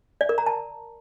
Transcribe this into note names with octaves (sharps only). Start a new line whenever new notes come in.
D5
A#4
A#5
A5